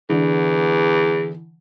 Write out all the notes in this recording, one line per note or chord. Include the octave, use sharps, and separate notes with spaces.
E2 D3 E3